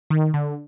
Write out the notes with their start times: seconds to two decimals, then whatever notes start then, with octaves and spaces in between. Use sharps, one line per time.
0.10 D#3
0.34 D3